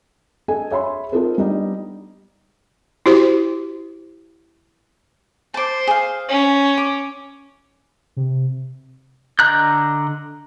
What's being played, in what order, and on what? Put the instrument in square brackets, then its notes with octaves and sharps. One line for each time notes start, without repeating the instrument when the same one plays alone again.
[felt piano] A4 D#5 G#5
G#4 C#5 E5 B5 C6
C4 D#4 F4 A4 A#4 C5
G3 B3 D4 D#4
[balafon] E4 F#4 G4 C5
[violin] C5 [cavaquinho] A5 D6
[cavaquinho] G#4 F5
[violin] C#4
[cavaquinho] D6
[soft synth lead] C3
[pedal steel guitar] D3 D#5 A#5 F#6 G6